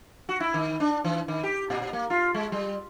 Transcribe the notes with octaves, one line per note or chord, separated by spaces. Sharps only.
F#4
E4
D#3
D4
E3
D#3
G4
A#2
A#3
F4
G#3
G3